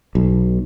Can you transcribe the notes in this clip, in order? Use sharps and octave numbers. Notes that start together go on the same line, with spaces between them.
B1